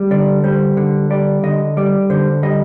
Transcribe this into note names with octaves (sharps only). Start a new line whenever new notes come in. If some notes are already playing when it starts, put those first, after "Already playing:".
Already playing: G3
D3 D5
G3 C5
D3
G3 D5
D3 D#5
G3 D5
D3 C5
G3 D#5